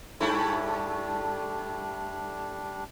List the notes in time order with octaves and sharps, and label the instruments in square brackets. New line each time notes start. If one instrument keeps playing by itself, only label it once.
[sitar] G2 A3 E4 [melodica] G3 D4